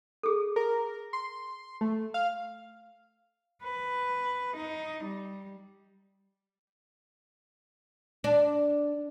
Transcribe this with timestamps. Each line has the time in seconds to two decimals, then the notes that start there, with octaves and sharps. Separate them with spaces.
0.23 G#4 A4
0.56 A#4
1.13 C6
1.81 A3
2.14 F5
3.63 B4
4.56 D#4
5.04 G3
8.24 D4